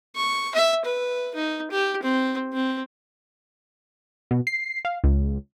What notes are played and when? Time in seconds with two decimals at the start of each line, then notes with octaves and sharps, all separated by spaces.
0.16 C#6
0.55 E5
0.85 B4
1.35 D#4
1.71 G4
2.02 C4
2.53 C4
4.31 B2
4.47 C7
4.85 F5
5.04 C#2